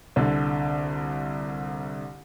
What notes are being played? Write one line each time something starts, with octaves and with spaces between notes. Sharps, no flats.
C2 D3